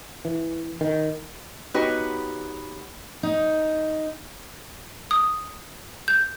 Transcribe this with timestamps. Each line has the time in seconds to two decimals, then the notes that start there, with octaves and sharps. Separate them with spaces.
0.25 E3
0.81 D#3
1.74 B3 D#4 F#4 G4 B4 C#5
3.23 D#4
5.11 D#6
6.08 G6